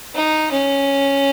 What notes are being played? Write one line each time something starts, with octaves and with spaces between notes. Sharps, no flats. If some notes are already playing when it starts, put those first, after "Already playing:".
D#4
C#4